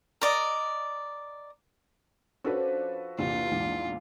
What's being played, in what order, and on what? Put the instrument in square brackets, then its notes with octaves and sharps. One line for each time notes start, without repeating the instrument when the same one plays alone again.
[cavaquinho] A#4 D5 D#5
[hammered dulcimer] F3 [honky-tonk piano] C#4 D4 C#5 [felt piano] F#4 A4 B4
[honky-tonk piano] A#1 E2 C3 [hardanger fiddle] F4
[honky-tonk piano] A#1 E2 G#2